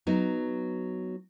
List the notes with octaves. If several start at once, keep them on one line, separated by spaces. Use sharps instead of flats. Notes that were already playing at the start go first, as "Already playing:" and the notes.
F#3 B3 D#4